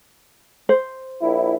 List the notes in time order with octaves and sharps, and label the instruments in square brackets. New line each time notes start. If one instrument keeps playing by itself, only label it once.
[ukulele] C5
[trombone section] A#1 E4